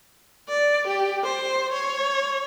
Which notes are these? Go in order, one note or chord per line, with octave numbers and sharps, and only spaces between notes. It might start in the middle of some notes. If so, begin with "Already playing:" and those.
D5
G4
C5
C#5